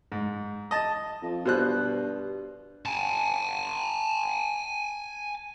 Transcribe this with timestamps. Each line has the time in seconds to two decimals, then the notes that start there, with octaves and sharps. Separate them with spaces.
0.12 G#2
0.71 D#5 A5
1.22 F2
1.45 G2 B2 C5 F#6
2.86 G#5 A5